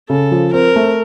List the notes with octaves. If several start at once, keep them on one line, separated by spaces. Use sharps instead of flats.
C#3 A4
F3
C4 A#4
A3